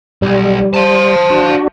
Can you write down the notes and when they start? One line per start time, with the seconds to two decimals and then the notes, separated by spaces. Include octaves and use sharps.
0.22 B1 G3
0.74 C5 F5 A5
1.30 D4 F#4